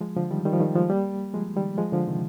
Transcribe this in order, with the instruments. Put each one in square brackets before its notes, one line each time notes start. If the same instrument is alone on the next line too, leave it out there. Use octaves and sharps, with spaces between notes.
[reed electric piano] F3 G#3
D3 F3
D#3 G3
D#3 G3
F3
D#3 G3
F3 G#3
G3 A#3
F3 G#3
D#3 G3
F3 G#3
D3 F3
C3 D#3